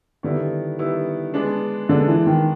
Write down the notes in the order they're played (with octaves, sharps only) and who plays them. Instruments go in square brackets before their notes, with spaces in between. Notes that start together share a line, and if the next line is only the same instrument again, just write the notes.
[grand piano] D3 [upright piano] D#3 G3 B3 E4
[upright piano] D#3 G3 B3 E4
G#3 B3 D4
[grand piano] D3 [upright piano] G#3 B3 D4
[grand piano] E3
D#3